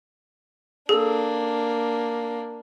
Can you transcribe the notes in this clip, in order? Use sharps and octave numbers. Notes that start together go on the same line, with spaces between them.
A#3 D4 G#4 A4 E6